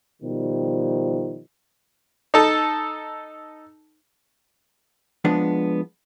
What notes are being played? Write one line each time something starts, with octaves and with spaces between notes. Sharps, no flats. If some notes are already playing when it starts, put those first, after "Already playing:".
B2 D#3 F3 G3
D#4 A4
F3 G#3 B3 D4